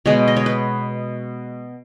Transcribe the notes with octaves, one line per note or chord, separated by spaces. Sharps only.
B2 G#3 B3 C#5
D#5
C#5
B4